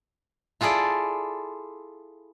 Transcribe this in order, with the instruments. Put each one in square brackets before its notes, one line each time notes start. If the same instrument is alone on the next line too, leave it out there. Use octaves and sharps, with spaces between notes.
[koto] E4 F4 G#4 A4 D5